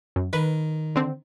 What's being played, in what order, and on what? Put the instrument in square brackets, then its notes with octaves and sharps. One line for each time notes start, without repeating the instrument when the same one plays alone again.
[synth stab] F#2
[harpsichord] D#3 [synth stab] B4
[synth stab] D3 C4